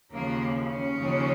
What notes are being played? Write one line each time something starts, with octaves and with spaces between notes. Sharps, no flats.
D#2 C#3 F3 A#3
C#4
D#2 C#3 F3